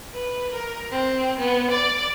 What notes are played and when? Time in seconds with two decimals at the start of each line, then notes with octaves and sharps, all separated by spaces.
0.14 B4
0.54 A#4
0.91 C4
1.39 B3
1.71 D5